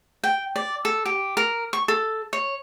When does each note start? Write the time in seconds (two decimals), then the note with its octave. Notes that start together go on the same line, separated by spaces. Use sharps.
0.24 G5
0.56 D5
0.85 A4
1.05 G4
1.37 A#4
1.73 C#6
1.88 A4
2.33 C#5